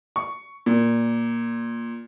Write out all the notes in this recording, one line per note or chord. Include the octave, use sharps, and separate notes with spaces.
C#6
A#2